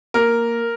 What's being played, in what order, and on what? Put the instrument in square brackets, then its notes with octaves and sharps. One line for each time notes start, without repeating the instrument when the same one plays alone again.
[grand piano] A#3 A#4